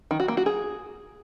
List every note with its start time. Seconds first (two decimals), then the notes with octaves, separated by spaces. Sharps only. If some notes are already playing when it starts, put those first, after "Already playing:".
0.11 D#3
0.20 F#4
0.28 A#3
0.37 F#4
0.46 G#4